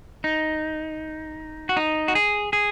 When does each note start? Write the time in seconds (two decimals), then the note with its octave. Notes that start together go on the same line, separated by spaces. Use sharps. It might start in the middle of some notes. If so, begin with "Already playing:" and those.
0.24 D#4
1.69 F#4
1.77 D#4
2.08 F#4
2.15 G#4
2.53 G#4